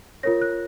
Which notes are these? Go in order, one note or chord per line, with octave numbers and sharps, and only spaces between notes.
F4 A#4 C#5 A#6
F#6